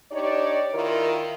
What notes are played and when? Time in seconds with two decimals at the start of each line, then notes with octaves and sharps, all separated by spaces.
0.12 D4 D#4 G4 C#5 D5
0.74 D#3 E4 F4 A#4